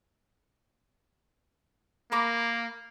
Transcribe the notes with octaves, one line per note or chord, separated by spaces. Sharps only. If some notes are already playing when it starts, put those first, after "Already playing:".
A#3 A#4 B5 D6